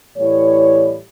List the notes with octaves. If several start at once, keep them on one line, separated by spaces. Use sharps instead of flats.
A2 E3 G3 C#5